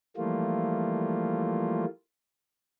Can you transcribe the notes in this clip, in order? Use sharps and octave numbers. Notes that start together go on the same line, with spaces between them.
E3 F3 G3 A3 A#3 F4